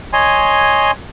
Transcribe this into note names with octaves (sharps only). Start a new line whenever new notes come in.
C#5 D#5 G#5 C6